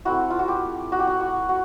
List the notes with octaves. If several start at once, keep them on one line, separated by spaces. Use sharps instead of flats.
A3 C4 E4 F#4
F4
F#4
G4
F#4
G4
F#4
F#4
F#4